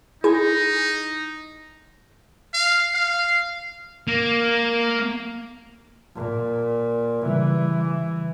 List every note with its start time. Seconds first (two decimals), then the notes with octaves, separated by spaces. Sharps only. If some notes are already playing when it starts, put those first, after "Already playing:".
0.24 D#4 E4 G#4 G#5
2.54 F5
2.94 F5
4.08 A#3
6.15 A#2
7.26 C#3 E3 G3